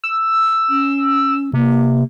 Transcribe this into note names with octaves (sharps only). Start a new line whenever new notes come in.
E6
C#4
C3 A#3